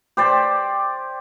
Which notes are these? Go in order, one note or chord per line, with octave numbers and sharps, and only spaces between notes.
G4 C5 D5